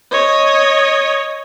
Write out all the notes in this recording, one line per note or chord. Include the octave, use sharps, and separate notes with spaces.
C#5 D#5